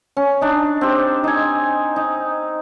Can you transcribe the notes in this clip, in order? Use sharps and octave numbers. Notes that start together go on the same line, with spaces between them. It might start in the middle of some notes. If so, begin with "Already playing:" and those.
C#4
D4 D#4
C4 G4
D#4 G#5
D#4